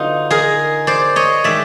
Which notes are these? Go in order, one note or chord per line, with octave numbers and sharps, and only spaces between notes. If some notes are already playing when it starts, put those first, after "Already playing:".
Already playing: D3 F#3 B3 D#4 F4
G#4 A#4
C5 D5
C#5 D#5
D#3 G#3 D5 E5